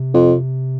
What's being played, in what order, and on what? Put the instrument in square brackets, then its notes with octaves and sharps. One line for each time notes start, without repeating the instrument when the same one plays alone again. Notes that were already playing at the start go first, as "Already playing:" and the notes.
Already playing: [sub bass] C3
[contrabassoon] F2